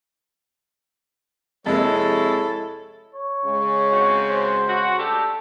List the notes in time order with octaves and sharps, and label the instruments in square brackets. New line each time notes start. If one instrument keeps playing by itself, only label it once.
[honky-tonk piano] F2 C3 A#3 [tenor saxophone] G#3 [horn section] E4 C#5 [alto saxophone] A4
[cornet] C#5
[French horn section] C#3 G#3
[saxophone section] C4 C#4 F#4
[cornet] C5
[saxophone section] F#4
[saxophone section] A3 D4 G4 [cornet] A4